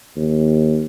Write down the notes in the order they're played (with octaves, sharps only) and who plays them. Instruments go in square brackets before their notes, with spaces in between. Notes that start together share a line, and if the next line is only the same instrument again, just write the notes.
[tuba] D#2